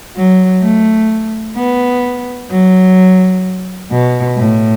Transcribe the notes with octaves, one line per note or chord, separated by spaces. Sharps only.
F#3
A3
B3
F#3
B2
A2